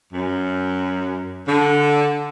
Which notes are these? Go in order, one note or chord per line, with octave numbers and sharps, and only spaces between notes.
F#2
D3